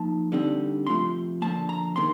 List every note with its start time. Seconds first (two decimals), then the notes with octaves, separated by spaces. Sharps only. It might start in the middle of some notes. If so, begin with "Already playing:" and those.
Already playing: F3 A#3 D#4 A5
0.32 D3 G3 C4 D#4
0.87 C3 F3 A3 C6
1.42 D3 F3 A#3 A5
1.69 A#5
1.96 C3 D#3 A#3 C6